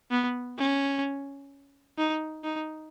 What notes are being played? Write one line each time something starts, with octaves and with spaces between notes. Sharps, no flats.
B3
C#4
D#4
D#4